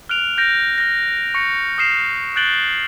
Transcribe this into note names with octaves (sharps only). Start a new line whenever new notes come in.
F6 F#6 D7 F7
F6 G6 A#6 D7
F6 A#6
C#6 A#6 C#7
D#6 F6 C7 E7 F7
F#6 G6 A6 D7 F#7 G7